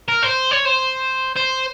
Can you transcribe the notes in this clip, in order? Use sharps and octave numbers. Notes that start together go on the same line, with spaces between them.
A#4
C5
C#5
C5
C5